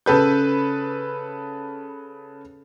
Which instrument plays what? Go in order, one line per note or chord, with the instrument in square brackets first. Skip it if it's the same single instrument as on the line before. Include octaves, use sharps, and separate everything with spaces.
[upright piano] C#3 A4 B4 G6